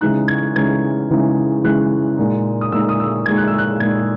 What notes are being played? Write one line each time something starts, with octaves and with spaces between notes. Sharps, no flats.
C#3 E3 G#3 D#4 F#6
G#6
C#3 E3 G#3 D#4 G#6
C#3 E3 G#3 D#4
C#3 E3 G#3 D#4 F#6
A#2 G#3 D#4
D#6
A#2 G#3 D#4 E6
D#6
E6
A#2 G#3 D#4 G#6
F#6
E6
F#6
A#2 G#3 D#4 G#6